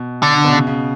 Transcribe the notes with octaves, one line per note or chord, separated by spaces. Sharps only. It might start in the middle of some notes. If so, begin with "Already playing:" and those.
Already playing: B2
D3
B2
C#3
C#3